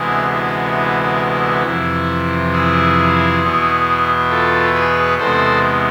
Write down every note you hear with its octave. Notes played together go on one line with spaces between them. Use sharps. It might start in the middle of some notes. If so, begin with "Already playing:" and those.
Already playing: D2 C3 E3 G#3 B3 E4 G#4
E4
E4
F2 C3 E3
E4 G#4
E2 B2 B3
F4 A4
G#4 B4
E2 C3 G#3 B3 A4 C5